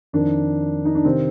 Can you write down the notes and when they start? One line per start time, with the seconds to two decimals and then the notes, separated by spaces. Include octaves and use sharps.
0.13 F2 D#3 D4
0.85 D#4
0.95 D4
1.05 C3 D#3 C4